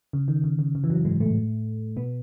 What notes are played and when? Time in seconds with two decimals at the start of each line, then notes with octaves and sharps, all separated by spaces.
0.13 C#3
0.28 D#3
0.44 C#3
0.59 C#3
0.75 C#3
0.84 E3
0.89 F#2 F#3
1.05 G#2 G#3
1.20 A2 A3
1.96 B2 B3